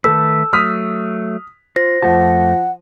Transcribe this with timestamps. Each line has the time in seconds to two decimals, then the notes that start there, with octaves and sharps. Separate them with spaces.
0.04 D#3 A3 A4 B4 E6
0.53 F#3 A3 D#6 F6 B6
1.76 F4 C5 A#6
2.02 F2 F3 A3 F#5 A5